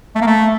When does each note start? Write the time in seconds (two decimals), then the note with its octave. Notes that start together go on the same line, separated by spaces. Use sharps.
0.16 A3
0.21 A#3
0.27 A3